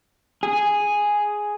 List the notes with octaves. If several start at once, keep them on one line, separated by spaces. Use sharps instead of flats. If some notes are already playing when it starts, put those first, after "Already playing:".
G#4